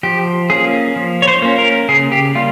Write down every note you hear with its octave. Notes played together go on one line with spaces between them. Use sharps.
F3 G4
A#3 C#4 G#4
F3
C#5
C5
A#3 C#4
A#4
C#3 G#4
G4
G3 A#3 F4